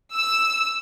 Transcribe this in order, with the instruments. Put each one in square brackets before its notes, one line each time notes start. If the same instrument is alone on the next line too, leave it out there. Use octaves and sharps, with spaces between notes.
[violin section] E6